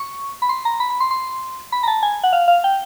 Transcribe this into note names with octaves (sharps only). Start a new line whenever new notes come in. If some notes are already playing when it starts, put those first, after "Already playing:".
Already playing: C#6
B5
C6
A#5
B5
B5
C6
C6
B5
A#5
A5
G#5
F#5
F5
F5
G5